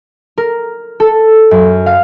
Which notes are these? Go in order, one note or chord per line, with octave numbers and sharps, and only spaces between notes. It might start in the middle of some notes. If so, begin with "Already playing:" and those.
A#4
A4
F#2
F5